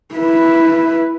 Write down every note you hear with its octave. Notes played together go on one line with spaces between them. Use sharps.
E4 B4